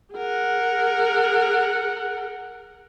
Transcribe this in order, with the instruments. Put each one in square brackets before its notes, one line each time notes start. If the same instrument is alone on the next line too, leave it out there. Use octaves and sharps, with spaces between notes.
[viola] G#4 A#4 [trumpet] F#5